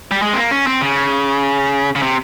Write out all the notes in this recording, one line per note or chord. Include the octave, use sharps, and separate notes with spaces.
G3
G#3
C4
A#3
C#4
C4
C#3
C#3
C3